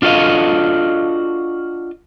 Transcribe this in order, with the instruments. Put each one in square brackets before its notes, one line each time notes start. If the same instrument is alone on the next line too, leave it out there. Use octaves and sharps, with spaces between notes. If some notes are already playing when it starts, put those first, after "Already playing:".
[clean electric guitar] D4 F4 F#4 A4 D#5 F5